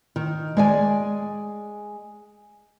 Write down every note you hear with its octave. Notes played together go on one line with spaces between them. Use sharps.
D#3
G#3 D5 G#5